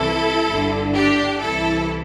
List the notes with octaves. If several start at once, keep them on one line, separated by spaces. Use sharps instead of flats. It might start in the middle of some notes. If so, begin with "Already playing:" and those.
Already playing: C2 C3 E3 E4 A4
G1 G2 D3
D4 G4
C2 C3 E3 E4 A4